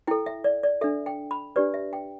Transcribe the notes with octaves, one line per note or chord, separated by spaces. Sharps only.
E4 A4 G5
E5
D5
D5
D4 A4 E5
G5
B5
D4 G4 B4 D5
E5
G5